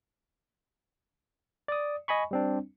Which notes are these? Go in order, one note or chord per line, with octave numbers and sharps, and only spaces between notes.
D5 D#6
D#5 G#5 B5 C#6
G3 C4 D4